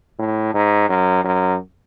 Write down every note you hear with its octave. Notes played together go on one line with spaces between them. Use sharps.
A2
G#2
F#2
F#2